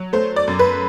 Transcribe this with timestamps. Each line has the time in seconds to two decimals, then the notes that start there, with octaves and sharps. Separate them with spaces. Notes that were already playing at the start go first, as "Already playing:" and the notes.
Already playing: F#3
0.13 A3 C5
0.36 D5
0.48 F#2
0.59 B4